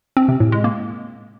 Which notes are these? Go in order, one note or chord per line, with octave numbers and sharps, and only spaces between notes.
C4
C3
A2
G#3
A#3